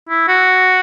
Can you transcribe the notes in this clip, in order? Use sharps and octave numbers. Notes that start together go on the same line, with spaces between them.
E4
F#4